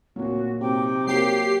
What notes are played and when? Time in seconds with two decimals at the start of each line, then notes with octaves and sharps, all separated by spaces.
0.16 D1 A#2 F#3 F#4
0.61 C3 D#4 G5 D6
1.07 F#3 A#3 G4 C7